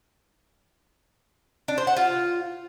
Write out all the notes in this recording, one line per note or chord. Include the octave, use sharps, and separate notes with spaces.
D4
C5
F#5
F4